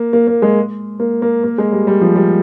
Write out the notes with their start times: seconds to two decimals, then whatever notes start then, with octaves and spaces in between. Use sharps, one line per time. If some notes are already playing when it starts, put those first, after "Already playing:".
Already playing: A#3
0.13 A#3
0.27 A#3
0.42 G#3
1.00 A#3
1.22 A#3
1.44 A#3
1.58 G#3
1.72 G3
1.87 G3
2.01 F3
2.16 G3